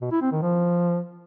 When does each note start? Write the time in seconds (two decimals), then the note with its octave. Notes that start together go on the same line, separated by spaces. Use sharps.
0.01 B2
0.12 E4
0.22 C4
0.32 D#3
0.42 F3